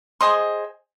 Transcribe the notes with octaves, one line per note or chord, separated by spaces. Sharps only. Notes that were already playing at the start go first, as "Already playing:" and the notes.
G#4 C5 D#5 C6 D#6